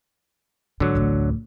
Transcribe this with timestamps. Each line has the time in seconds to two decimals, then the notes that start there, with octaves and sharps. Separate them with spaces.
0.80 G#2 D3 F#3
0.95 A1 D2